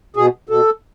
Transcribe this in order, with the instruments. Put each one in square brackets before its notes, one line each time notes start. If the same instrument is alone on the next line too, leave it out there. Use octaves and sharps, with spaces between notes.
[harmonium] B2 G#4
B2 A4